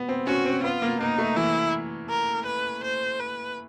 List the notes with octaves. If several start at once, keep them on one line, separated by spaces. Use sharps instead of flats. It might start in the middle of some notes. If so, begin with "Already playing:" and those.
Already playing: B3
C4
C#4 F#4
C4
B3 F4
A#3
A#3 D#4
A3
E3 E4
A#4
B4
C5
B4